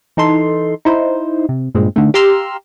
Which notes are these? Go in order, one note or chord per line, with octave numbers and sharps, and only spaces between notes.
E3 D#4 A4 C6
D#4 E4 C5
C3
G2 A#2 G#3 C4
D3 D#3 A3
G4 F5 A#5 C6 E6 F6